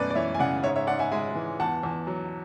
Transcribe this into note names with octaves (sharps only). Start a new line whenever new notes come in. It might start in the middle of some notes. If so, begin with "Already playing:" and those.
Already playing: F#2 B2 A3 B4 D5
D5
E3 C#5 E5
G#5
C#3 D5 F#5
G#2 C#5 E5
C#5 E5
G#2 D5 F#5
E5 G#5
G#3 E5 G#5
E3
E2 F#5 A5
E2
F#3